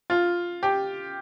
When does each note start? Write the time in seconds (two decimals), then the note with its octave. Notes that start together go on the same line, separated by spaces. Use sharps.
0.10 F4
0.63 G4